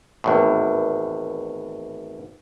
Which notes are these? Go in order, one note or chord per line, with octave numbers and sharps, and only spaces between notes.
G#1 E2 A2